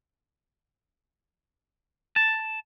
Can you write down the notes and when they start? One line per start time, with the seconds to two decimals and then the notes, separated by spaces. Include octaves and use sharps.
2.16 A5